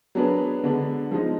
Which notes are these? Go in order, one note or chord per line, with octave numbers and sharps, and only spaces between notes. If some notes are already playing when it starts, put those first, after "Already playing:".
F#3 B3 D4 G#4 B4
D3 G#3 B3 D4
F3 G#3 D#4